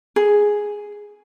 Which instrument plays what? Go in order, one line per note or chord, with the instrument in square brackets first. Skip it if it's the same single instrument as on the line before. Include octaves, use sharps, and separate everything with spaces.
[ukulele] G#4